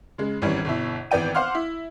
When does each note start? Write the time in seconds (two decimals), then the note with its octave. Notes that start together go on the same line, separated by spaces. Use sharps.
0.18 C#3 G#3
0.42 G#1 E3 G3 C#4
0.65 G1 B2 E4
1.11 G#1 E3 B3 D5 G5 D#7
1.35 C5 F5 F#5 C6 D6 F6
1.55 E4